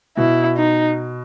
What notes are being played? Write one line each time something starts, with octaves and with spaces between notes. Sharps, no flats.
B2 E4
D#4